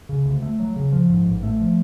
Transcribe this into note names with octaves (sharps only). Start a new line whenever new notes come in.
C#3
D2
A3
F#3
C#3
F3
G#2
A1
A3
F3